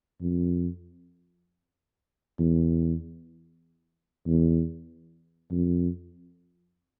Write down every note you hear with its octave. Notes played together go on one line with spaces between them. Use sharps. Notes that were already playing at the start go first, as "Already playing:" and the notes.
F2
E2
E2
F2